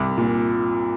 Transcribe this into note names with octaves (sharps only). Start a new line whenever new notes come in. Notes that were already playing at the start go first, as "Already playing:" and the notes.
Already playing: C2 D6
A#2